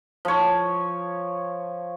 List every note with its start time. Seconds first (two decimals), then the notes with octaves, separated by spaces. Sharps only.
0.25 F3 C#5